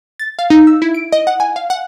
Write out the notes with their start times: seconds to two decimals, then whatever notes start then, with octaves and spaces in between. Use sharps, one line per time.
0.19 A6
0.39 F5
0.50 D#4
0.67 E6
0.82 E4
0.94 D7
1.12 D#5
1.27 F#5
1.40 G#5
1.56 F5
1.70 F#5